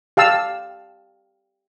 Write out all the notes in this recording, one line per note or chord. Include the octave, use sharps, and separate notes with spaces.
G4 F5 A5 E6